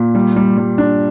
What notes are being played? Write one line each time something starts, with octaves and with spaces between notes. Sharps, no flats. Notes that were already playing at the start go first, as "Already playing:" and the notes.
Already playing: A#2
G3
G3
G3
D4